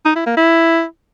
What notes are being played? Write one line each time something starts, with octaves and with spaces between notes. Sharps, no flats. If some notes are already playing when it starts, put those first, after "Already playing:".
D#4
E4
A#3
E4